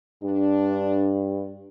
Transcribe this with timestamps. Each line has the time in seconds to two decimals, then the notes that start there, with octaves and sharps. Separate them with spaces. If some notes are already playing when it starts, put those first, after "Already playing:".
0.24 G2 D4